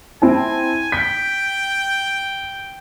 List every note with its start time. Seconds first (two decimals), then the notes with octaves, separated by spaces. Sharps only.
0.22 C4 E4 G#5 A5
0.92 G5 B6